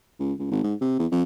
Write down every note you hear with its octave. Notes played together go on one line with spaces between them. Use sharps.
C#2
C#2
G#1
G#2
C3
E2
F2